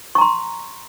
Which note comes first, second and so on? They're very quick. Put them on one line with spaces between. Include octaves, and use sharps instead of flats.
C#6 A#5 C6